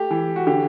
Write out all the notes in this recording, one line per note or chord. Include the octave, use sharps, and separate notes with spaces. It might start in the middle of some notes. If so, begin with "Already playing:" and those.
Already playing: A3 G4
E3
F#4
D3 G4